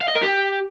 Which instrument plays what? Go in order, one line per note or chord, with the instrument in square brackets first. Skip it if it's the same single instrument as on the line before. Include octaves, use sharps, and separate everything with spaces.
[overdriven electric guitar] F5
D#5
A#4
G4